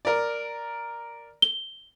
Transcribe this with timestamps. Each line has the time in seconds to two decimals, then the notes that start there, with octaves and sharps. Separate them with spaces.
0.05 A#4 D5
1.42 G7